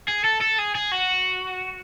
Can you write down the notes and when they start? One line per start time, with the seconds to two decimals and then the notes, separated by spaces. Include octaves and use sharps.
0.08 G#4
0.24 A4
0.41 A4
0.58 G#4
0.75 G#4
0.92 F#4